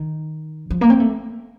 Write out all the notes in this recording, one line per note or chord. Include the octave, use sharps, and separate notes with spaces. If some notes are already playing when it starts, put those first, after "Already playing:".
Already playing: D#3
F3
A#3
C4
A3